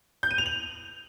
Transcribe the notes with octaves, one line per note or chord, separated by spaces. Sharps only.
G6
D#7
F7
F#7